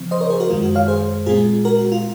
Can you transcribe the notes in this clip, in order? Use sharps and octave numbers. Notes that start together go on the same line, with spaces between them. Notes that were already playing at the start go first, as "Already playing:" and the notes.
Already playing: C#3 F3 C4
C5 D#5
A#4 C#5
G#4 C5
F#4 A#4
F#2 D#3 G#3 F4
F#4
C#5 F5
G#4 C5
A#2 G#3 C4 F4 G#4
F#4 A#4
F#4
F4